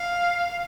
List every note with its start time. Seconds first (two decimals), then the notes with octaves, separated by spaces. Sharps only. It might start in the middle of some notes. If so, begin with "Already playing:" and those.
Already playing: F5